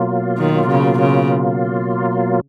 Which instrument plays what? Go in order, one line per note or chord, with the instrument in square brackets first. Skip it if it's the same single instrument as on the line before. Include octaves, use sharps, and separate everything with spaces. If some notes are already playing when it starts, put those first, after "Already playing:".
Already playing: [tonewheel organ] B2 F#3 A#3 F4
[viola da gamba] D#3
C#3
C#3